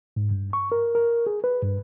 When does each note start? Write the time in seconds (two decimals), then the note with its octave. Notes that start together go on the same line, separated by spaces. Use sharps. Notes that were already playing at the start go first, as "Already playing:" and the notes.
0.16 G#2
0.31 G2
0.53 C#6
0.72 A#4
0.95 A#4
1.27 G#4
1.44 B4
1.63 G2